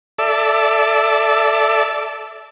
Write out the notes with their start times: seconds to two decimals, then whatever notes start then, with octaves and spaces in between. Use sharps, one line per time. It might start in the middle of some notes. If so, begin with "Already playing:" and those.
0.19 A4 D5 E5